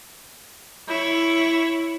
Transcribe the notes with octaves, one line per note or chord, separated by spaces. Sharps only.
E4 C#5